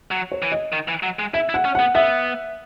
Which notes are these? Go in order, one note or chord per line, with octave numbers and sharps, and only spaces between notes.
F#3
C#5
E3
D#5
D#3
E3
F#3
G#3
E4 E5
E4
F#5
C#4
B3 F#5
B3 E5